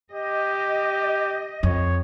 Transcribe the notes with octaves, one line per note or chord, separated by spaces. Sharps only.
G4 D#5
F2 C#5